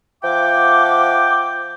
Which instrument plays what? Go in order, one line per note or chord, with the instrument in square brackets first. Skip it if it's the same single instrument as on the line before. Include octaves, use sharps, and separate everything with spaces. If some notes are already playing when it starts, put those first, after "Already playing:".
[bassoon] F3 [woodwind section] E5 F#5 D6 [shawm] G5